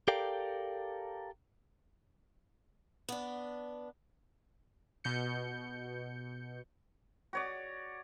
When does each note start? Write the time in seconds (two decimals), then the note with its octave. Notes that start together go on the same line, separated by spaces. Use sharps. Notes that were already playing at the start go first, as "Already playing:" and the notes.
0.08 G4 A4 A#4 D5 F5 G5
3.09 B3 D4
5.04 B2 G6 C#7
7.33 F#4 C#5 D5